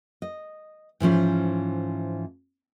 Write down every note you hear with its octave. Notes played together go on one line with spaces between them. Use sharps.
D#5
G#2 E3 F3 C#4